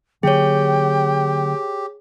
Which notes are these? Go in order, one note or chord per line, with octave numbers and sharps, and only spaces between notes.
D3 F#3 A#3 G4 G#4 C#5 G5